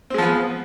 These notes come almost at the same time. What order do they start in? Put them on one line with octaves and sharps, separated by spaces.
C4 G#3 F3 B3